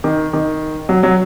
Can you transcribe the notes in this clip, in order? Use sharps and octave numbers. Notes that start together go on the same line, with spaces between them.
D#3
D#3
F#3
F#3